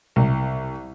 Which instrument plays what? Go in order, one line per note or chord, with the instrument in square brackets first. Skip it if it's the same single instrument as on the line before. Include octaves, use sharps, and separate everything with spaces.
[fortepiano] C2